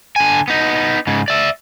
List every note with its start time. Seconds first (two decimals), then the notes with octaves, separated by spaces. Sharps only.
0.16 D3 G#5
0.48 B3 D#4
1.07 G#2 C#3
1.28 D5 E5